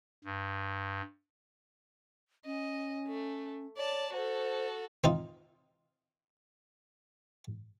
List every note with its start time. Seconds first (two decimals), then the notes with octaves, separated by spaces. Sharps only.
0.24 G2
2.45 C#4 D#5
3.07 A3
3.77 C#5 D5 A5
4.13 F#4 A4 C5
5.04 C4 D#4 F4